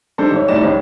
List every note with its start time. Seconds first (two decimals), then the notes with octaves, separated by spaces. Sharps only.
0.18 G3 G#3 D4 D#4 A4 C5
0.32 G#1 C#5
0.48 C2 A2 A3 D#4 D5 E7
0.63 G#1 C#2 C#4